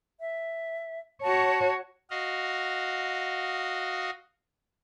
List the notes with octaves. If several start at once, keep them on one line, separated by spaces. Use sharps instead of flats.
E5
F#4 C#5 A5
F#4 D#5 F5